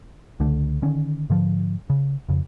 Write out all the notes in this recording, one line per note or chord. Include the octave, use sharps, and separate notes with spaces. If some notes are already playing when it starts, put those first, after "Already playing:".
C#2 D3 A3
D3 D#3 C#4
G#2 D3 F3
C#3
F2 C#3